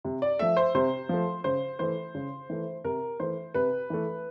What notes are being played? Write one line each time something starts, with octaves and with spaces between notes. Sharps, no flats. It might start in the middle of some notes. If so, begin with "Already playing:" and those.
C3
D5
F3 A3 E5
C5
C3 C5
F3 A3
C#3 C5
E3 A3 C5
C#3
E3 A3
C3 A#4
E3 A3 C5
C3 B4
E3 A3